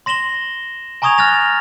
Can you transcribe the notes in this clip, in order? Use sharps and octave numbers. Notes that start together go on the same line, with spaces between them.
C6 A#6 E7 F#7 G7
G#5 A#5 C#6 D#6 G#6 F7
F6 F#6 A6 A#6 F7